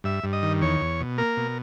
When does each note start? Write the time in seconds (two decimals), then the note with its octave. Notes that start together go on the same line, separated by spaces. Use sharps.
0.04 G2 E5
0.23 G2
0.33 D#5
0.43 D#3
0.61 E2 C#5
0.81 E2
1.00 B2
1.18 A#3 A#4
1.37 B2